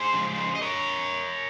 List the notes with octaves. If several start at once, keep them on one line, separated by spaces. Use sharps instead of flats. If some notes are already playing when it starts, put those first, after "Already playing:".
Already playing: G#4 C5
C#3 F3 G#3
D#5
A#4 C#5